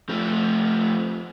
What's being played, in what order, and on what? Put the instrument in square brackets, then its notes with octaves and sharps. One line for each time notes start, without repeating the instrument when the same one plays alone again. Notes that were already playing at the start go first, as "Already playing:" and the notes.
[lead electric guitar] F3 A3